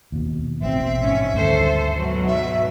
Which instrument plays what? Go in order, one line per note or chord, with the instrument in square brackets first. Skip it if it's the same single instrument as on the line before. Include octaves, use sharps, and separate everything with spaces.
[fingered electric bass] D#2 B2
[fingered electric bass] A1 B2 [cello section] C4 [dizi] E5
[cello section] G#2 C#4
[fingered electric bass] D2 G2 D#3 [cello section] A4 C5
[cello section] G#2 B2 F#3
[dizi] E5